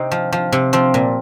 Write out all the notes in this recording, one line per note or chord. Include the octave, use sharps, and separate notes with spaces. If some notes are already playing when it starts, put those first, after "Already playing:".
Already playing: C3 C4 D#4
F3
F3
C3
F3 C4
A#2